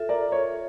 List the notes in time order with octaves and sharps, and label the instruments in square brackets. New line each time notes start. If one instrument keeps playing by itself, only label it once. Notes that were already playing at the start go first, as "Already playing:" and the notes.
Already playing: [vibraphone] F4 A4 E5
[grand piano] A#4 D5
C#5